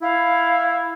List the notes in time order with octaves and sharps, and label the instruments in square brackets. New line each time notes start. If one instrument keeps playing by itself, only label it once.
[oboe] E4 [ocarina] F5